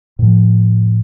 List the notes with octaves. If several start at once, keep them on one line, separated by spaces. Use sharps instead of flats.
A2 F3